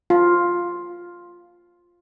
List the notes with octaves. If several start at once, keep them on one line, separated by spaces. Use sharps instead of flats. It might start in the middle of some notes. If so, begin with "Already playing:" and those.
F4